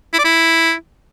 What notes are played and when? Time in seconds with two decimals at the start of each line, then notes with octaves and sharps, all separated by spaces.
0.13 E4
0.19 D5
0.24 E4